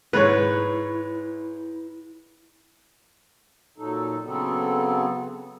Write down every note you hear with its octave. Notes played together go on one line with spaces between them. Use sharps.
G#2 E4 B4 C#5
A#2 F#3 D#4 A4
C#3 F#3 B3 C4 A4